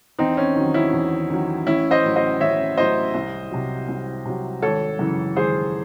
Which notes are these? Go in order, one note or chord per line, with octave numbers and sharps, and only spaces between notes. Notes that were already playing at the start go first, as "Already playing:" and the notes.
E2 C4 D#4
C#4
D#3 F#3
C#4 E4
E2
D#3 F#3
A1 C#4 E4
C5 D#5
A2 F#3
C5 D#5
A1 C#5 E5
A2 F#3 C5 D#5
C2
C3 F#3
C2
C3 F#3
G#1 A4 C#5
F#2 C#3 E3
G#1 G#4 C5